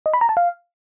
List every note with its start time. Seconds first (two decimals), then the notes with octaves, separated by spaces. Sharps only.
0.06 D#5
0.14 B5
0.21 A#5
0.29 A5
0.37 F5